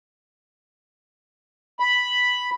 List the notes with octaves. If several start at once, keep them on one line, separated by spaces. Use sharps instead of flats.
B5